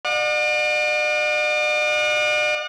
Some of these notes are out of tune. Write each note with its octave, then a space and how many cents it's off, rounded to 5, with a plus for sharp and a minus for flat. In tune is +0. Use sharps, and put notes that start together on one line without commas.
D5 +45 F#5 -30